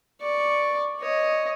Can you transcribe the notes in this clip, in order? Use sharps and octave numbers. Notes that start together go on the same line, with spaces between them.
D5 C#6
C#5 D#5